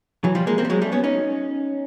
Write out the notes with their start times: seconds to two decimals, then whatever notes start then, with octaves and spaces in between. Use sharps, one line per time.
0.24 E3 F#3
0.35 F3 G3
0.47 G#3 A#3
0.58 A#3 C4
0.65 G3
0.70 F#3 G#3
0.82 G3 A3
0.92 B3 C#4
1.04 C#4 D#4